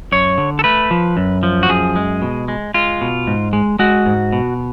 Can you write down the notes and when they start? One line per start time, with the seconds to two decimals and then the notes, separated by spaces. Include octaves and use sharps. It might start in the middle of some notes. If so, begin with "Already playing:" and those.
0.12 F#2 C#5
0.38 D3
0.59 A4
0.64 A3 B4
0.91 F3
1.17 F#2
1.43 F3
1.63 F#4
1.69 F#2 G#4
1.96 G#3
2.22 B2
2.48 G#3
2.74 G#3 F4
3.01 B2
3.27 G#2
3.53 G#3
3.79 G#3 F#4
4.06 G#2
4.33 B2